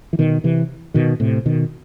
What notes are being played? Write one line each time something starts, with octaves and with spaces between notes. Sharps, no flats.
E3
B2 D#3
C3 E3
B2 D#3
A2 C3
B2 D#3